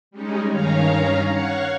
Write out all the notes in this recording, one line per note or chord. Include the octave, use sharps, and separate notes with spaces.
G3 G#3 C#4 D#4
G2 D#3 C#4 C#5 F5 A#5
C#5 F5 F#5 C#6